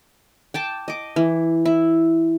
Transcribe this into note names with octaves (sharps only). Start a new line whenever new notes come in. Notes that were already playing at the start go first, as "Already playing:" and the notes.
G5 A5 D6
D#5 D6
E3
E4